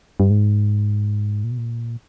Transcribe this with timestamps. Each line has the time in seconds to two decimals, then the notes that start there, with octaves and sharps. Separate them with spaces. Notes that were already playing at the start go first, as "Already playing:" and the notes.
0.20 G2
0.30 G#2
1.44 A#2
1.51 B2
1.58 A#2